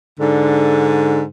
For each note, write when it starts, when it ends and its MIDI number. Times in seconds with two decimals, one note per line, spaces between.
0.19 1.24 44
0.19 1.24 50